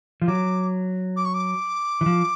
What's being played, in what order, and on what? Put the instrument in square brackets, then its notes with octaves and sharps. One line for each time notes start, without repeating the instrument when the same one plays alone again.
[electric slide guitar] F3
[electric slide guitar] F#3 [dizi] D6
[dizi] D6
C#6
D6
[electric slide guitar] E3
F3